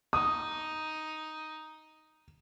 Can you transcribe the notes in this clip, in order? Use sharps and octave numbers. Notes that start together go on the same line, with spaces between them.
D#4 D#6